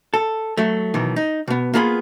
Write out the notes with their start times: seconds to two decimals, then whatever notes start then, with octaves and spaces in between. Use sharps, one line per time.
0.14 A4
0.57 F#3 A3
0.94 B1 B2 D#3 E3
1.16 D#4
1.48 B2 B3
1.74 A#3 B3 F4 G#4 F5 B5